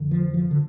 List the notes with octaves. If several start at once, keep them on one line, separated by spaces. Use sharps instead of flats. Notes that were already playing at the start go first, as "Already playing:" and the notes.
Already playing: F2 D3
F3
F3
D3